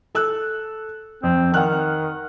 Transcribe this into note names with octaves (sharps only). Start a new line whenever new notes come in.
A4 E6 F#6
F2 C4
D#3 F#5 F6 F#6